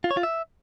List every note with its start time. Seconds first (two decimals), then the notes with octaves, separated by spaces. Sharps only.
0.04 F4
0.11 C#5
0.17 F4
0.23 E5